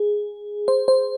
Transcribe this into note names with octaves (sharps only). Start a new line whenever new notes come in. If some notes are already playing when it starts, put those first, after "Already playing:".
Already playing: G#4
C5
C5